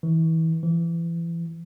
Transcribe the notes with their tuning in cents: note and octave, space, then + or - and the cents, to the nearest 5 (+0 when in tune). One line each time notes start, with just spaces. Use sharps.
E3 -30
E3 +30